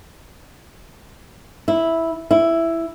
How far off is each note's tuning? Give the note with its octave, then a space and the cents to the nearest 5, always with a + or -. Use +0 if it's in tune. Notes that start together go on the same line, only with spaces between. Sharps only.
E4 -5
E4 +5